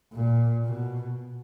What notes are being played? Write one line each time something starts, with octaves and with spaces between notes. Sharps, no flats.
A#2
B2